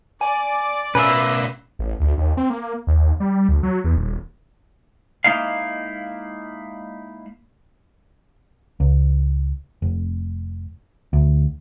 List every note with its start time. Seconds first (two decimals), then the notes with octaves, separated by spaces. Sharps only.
0.21 D5 G#5
0.95 B2 C#4 A#4 B4 E5 F5
1.79 A1
2.00 D2
2.18 D#2
2.37 C4
2.50 A#3
2.87 D#2
3.20 G3
3.49 D2
3.63 F#3
3.84 E2
3.97 D#1
5.24 G#3 A#3 D#4 E4 F5
8.80 C#2
9.82 F1
11.13 D2